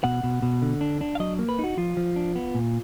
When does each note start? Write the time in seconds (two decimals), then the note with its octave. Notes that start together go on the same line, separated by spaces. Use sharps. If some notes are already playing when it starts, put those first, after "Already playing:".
0.04 B2 F#5
0.23 B2
0.42 B2
0.62 D3
0.81 D4
1.01 D4
1.15 F5
1.20 F#3 D#5
1.39 A#3
1.49 B4
1.59 D#4 F#4
1.77 F3 F4
1.97 F3
2.16 D4
2.36 B3
2.55 A#2